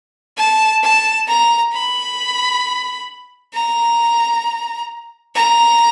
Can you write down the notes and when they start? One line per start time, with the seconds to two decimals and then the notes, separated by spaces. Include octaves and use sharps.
0.37 A5
0.83 A5
1.28 A#5
1.73 B5
3.54 A#5
5.35 A#5